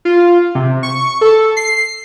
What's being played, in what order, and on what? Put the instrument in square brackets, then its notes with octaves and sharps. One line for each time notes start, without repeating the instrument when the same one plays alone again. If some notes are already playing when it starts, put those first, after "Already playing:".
[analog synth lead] F4
C3
C#6
A4
C7